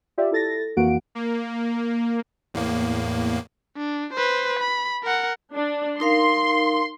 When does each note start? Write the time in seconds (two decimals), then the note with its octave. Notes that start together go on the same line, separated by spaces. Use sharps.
0.18 F4 G4 D5 E5
0.31 E4 A4 A6 A#6
0.77 F2 E3 A#3 F#4 F#5 D7
1.15 A#3
2.54 E2 A2 A#3
3.77 D4
4.13 B4 C5
4.60 B5
5.04 A#4 F#5
5.54 D4
6.00 D#4 A#4 F5 C6